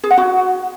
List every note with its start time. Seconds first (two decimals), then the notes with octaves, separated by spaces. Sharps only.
0.04 G#4
0.11 F#5
0.18 F#4